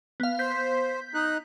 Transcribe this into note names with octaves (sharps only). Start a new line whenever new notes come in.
B3 F5
C5 G6 B6
D#4 F#6